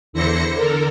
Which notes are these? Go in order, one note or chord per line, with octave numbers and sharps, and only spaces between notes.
E2 D3 E4 C5 A#6 C#7
D3 A4 A#4